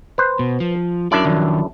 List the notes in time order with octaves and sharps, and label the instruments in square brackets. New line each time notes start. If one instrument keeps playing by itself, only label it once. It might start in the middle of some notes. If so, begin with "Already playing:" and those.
[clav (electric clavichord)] B4 C5
[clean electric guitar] B2
F3
[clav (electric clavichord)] F#2 D4 E4 [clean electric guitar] D5
[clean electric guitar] D#3 F3